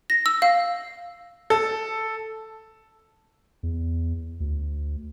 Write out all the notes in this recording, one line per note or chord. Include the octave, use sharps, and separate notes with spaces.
A#6
E6
F5
A4
E2
D2